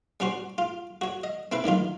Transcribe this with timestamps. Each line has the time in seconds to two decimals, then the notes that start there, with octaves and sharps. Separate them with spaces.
0.20 G3 C#4 F#4 C5
0.58 F4
1.01 F#4 C#5
1.24 D#5
1.52 C4 E4 B4
1.64 D2 D#3 F#3 F4